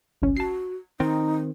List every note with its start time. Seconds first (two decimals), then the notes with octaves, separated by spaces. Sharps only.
0.22 G1 C2 C#4
0.37 F#4 A5 C7
1.00 D#3 C4 D#4